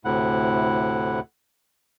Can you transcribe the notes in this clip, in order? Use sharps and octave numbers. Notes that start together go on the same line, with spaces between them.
D2 A2 C3 E4 F#5